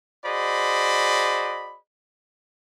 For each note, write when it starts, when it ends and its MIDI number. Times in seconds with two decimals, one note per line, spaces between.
0.24 1.76 66
0.24 1.76 68
0.24 1.76 72
0.24 1.76 74
0.24 1.76 75
0.24 1.76 83